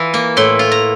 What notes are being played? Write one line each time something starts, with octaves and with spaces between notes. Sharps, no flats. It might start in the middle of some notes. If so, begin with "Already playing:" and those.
Already playing: E3 F4
A#3
A2 C6
F4
A#5